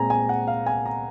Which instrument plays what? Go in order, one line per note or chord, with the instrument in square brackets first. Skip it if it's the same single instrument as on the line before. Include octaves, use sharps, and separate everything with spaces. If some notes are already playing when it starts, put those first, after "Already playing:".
Already playing: [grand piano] A#2 G#3 C4 G#5 A#5
G#5
F#5
F5
G#5
A#5